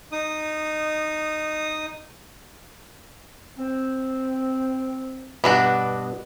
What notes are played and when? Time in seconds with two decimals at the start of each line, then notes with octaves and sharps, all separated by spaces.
0.12 D#4 D#6
3.59 C4
5.44 G2 B2 B3 D4 F#4